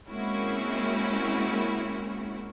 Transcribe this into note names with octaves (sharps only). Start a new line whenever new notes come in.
G#3 A#3 C4 C#4 E4 F#4